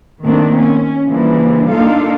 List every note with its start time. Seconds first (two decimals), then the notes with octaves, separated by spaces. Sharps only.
0.23 D#3 A3 A#3 C4 D4
0.60 C#4
1.08 C#3 E3 F3 G3 A#3 D4
1.72 A#3 D4 D#4 F4 A4 F5